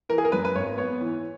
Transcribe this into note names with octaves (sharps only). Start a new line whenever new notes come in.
E3 A#4
G#4
A#4
F#2 B4
B4
G#1 C#5
B3 C#5
E3